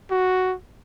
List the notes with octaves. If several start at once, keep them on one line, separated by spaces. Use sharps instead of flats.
F#4